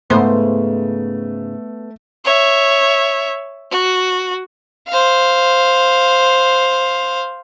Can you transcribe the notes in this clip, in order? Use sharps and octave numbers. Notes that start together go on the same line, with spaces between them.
G#2 C#3 A3 B3 C5
C#5 E5
F#4
C5 F5